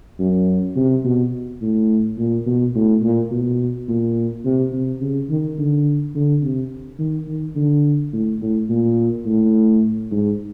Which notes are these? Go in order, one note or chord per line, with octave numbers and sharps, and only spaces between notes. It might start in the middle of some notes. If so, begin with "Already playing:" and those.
F#2
C3
B2
A2
A#2
B2
A2
A#2
B2
A#2
C3
C3
C#3
D#3
D3
D3
C3
D#3
D#3
D3
A2
A2
A#2
A2
G#2